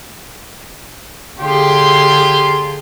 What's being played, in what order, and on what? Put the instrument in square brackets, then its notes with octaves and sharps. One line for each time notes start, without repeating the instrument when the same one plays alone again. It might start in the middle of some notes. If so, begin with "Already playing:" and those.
[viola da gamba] D3 G#4 [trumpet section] F4 G4 C6